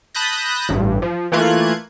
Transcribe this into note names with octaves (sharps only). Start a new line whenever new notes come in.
A5 B5 D#6 F#6 G6 A#6
A1 G2
F3
E3 A3 A#3 F4 F#6 G#6